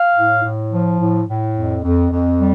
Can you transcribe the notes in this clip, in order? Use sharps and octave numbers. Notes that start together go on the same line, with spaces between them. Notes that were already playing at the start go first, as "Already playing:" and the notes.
Already playing: F5
A2
A2
F3
A2
A2
F2
F2
F2
G3